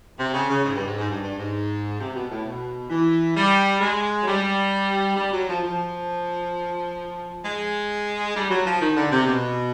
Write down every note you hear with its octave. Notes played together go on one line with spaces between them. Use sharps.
C3
C#3
C#3
G#2
G2
G#2
G#2
G2
G2
G#2
C3
B2
A2
B2
E3
G3
G#3
F#3
G3
G3
F#3
F3
F3
G#3
G3
F#3
F3
D#3
D3
C3
B2